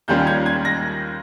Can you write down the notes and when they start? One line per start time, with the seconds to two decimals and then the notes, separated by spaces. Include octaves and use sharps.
0.08 D#2 D#3 G3 C#4 F4 G6
0.27 G#6
0.46 G#6
0.65 A#6